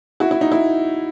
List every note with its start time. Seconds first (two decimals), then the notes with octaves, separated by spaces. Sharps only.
0.20 E4 F#4
0.31 E4
0.41 D#4
0.52 E4